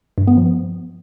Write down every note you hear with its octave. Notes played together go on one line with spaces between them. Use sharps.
G2
B3
F3